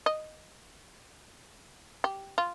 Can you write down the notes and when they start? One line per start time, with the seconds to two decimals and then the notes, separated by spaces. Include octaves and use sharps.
0.06 D#5
2.04 G4
2.38 F4